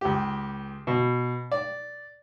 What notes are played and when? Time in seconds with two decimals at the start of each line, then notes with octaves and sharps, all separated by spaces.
0.01 C#2 G4
0.87 B2
1.52 D5